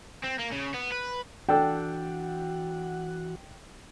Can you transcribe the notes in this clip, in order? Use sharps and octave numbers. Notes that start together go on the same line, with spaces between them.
C4
A#3
C#3
B3
B4
E3 D4 F#4 A4 F#5 G5